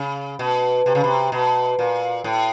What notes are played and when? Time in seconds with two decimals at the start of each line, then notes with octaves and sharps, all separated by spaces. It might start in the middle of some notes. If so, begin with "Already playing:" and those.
Already playing: C#3
0.39 B2
0.86 C3
0.95 C#3
1.04 C3
1.32 B2
1.79 A#2
2.24 A2